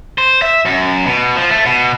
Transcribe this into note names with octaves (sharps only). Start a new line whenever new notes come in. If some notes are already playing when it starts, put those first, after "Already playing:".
C5
E5
F#2
B2
F3
A3
B2